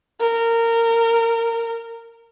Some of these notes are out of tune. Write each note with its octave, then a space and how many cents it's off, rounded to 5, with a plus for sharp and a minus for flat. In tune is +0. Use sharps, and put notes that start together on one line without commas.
A#4 -20